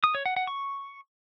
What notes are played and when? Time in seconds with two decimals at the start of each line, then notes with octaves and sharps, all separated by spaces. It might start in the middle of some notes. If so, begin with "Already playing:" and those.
0.04 D#6
0.15 C#5
0.26 F#5
0.36 F#5
0.47 C#6